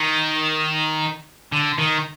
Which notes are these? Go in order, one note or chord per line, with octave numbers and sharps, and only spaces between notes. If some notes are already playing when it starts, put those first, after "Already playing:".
Already playing: D#3
D3
D#3